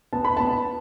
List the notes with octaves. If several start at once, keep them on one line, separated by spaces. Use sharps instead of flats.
B3 A5
B5
B3 A5